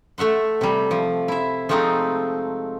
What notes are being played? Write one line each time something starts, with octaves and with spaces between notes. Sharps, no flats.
A3 E5 F#5 C6
C3 G3
F3
E4 E5
F3 G#3 A3 C4 D#4